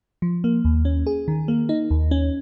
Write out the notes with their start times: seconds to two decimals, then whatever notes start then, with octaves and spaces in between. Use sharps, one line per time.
0.22 F3
0.44 A#3
0.65 D#2
0.85 C#4
1.06 G#4
1.28 D#3
1.48 A#3
1.69 D#4
1.91 D#2
2.11 C#4